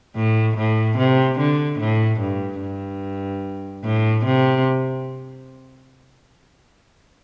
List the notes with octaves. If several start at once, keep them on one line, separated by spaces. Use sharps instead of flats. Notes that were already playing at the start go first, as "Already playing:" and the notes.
A2
A2
C3
D3
A2
G2
G2
A2
C3